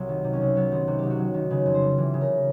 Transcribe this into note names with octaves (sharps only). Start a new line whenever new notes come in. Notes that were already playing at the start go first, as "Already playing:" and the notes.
Already playing: C2 F#3
D#3
C3
C#4
C2
F#3 B3
D#3 C4
C3 F#4
C2 G4
F#4
F#3
D#3
C#3 B4
F2
C5
G3
E3
C#3
A#4